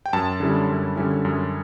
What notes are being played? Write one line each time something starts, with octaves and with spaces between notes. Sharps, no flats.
G5
F#2 A5
D3 G3 C#4 E4
F#2
D3 G3 C#4 E4
F#2